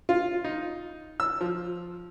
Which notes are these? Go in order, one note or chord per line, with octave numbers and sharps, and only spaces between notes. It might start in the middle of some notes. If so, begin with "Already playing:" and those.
F4
D#4
E6
F3